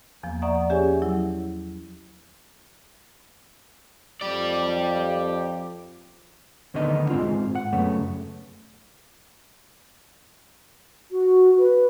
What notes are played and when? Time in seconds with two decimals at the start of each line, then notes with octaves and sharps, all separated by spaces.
0.23 E2 F3 A#3 B3
0.42 D5 E5 F#5 A#5 C#6 D#6
0.70 C#4 G4 G#4 C#5 E5 G#5
1.02 F#3 E4
4.21 F2 G4 D5
6.74 D2 D3 D#3 B3 D#5
7.10 G#2 G#3 C4 F4
7.55 F#5
7.73 F#2 C#3 A3 B3
11.10 F#4
11.57 B4